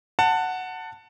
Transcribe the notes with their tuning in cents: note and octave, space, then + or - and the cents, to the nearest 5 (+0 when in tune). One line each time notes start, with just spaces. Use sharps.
F#5 +0 A5 +20